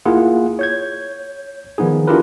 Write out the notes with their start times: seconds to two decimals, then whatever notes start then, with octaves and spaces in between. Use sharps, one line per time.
0.05 A#3 E4 F4 G#4 F#5
0.59 C#5 G6 G#6
1.78 D#3 F3 B3 D#4 G#4
2.07 D4 E4 F4 G4 A#4 B4